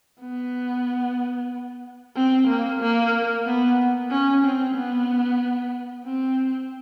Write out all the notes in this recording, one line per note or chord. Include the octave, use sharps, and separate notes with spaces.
B3
C4
A#3
A#3
B3
C#4
C4
B3
C4